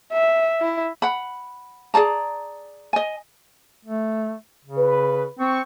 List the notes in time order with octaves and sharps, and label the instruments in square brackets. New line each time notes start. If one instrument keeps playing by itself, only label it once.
[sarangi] E5
E4
[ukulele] F#5 B5
G#4 D5 A5 A#5
D#5 G#5
[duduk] A3
C#3
[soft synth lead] B4
[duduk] C4 [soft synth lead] C#6